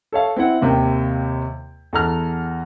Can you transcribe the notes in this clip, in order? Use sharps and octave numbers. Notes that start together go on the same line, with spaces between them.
A4 C#5 F5
C4 E4 F#5
D#2 C3 A#3 G5
E2 A4 A#5 F6